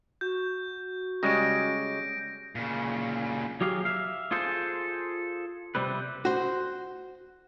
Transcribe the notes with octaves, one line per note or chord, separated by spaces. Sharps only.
F#4 G6
C#3 G3 G#3 A#6 D7
A#2 C#3
F#3 G4 G#4 F5
E5 F5
F4 G#4 A4 C5
C3 G3 C4 B4
F#4 C5